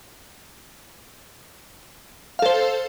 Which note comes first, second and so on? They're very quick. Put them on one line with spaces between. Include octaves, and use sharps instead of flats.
F5 A4 C5